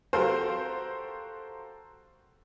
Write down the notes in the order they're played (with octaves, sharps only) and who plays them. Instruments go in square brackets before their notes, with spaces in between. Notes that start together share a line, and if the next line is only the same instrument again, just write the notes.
[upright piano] F#4 G4 A4 A#4 C5 F5